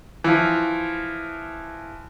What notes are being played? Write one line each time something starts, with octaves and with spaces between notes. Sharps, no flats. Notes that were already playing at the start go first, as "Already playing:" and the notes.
E3 F3